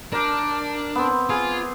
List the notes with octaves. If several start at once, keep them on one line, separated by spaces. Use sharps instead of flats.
D4 A#4 D5 G5
B3 C4
F4 G#4